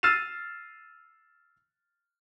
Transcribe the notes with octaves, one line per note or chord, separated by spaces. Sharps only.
E6 F6 A6 C7 D#7 E7